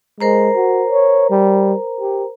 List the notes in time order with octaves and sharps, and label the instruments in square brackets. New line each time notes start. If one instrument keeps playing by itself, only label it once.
[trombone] G#3 [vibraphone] A#4 C5 A#5
[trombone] F#4
C#5
G3
G4